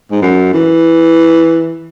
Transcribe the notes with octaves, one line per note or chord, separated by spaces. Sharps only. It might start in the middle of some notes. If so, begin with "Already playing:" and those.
G#2
F#2
E3